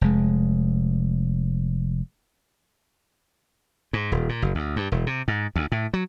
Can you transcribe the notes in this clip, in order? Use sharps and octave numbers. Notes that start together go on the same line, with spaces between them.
F1 G#3
G#2
D#1
A#2
F#1
D2
G2
E1
C3
G#2
D2
A2
F#3